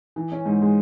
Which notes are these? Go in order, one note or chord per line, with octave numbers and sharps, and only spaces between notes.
E3
C#4
G#2
G#3